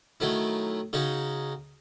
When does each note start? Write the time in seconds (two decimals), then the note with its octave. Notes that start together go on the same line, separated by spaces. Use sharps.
0.20 D#3 F#3 A3 E4
0.93 C#3 G#3 D#4 F#4